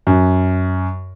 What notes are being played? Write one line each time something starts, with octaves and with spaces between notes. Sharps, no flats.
F#2